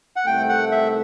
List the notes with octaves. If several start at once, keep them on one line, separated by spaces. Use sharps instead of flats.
F#5
C2 C3 D#3 A3 G5
F#5
E5